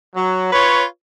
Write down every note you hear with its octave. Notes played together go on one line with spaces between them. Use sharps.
F#3
F4 B4 C#5